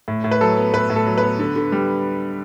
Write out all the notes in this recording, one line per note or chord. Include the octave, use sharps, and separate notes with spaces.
A2
A2
B4
F#3 A4
B3
A2 B4
A2
A4
F#3
B4
B3
D3
D3
G3